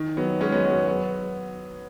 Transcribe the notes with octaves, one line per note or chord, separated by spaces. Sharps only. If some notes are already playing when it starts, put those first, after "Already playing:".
Already playing: D#3
F#3 B3
G#3 C#4
F#3 B3
F#3 B3
F#3 B3